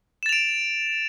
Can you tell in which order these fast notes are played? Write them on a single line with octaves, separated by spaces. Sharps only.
E7 A6 F7 D7